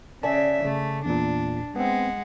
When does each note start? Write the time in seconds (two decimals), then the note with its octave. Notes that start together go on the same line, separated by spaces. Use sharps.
0.23 C#3 D5 E5 G#5 A5
0.65 C#3 A3
1.05 E2 A#2 D4
1.76 G#3 B3 C4 F#5